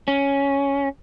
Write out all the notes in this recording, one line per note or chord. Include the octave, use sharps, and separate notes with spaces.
C#4